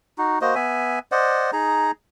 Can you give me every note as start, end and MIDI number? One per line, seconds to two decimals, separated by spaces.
0.18 0.39 63
0.18 0.39 66
0.41 0.55 58
0.41 0.55 66
0.41 0.55 72
0.41 0.55 75
0.55 0.99 59
0.55 0.99 76
0.55 0.99 80
1.12 1.51 72
1.12 1.51 74
1.12 1.51 75
1.12 1.51 78
1.53 1.91 63
1.53 1.91 68
1.53 1.91 82